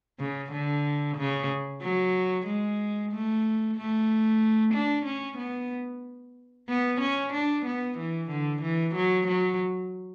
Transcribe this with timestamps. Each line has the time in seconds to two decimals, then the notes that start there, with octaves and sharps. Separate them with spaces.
0.19 C#3
0.53 D3
1.18 C#3
1.82 F#3
2.47 G#3
3.12 A3
3.77 A3
4.74 D4
5.06 C#4
5.38 B3
6.69 B3
7.01 C#4
7.34 D4
7.66 B3
7.99 E3
8.31 D3
8.63 E3
8.95 F#3
9.28 F#3